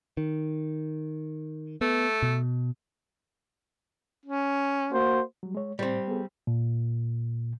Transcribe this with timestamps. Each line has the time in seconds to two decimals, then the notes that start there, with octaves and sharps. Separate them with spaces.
0.17 D#3
1.81 A3 B3
2.23 B2
4.25 C#4
4.92 A#3 F#4 C5
5.43 F#3 G3
5.55 G#3 C#5
5.79 A2 G3 C4 C5
6.08 B3 G#4 A4
6.47 A#2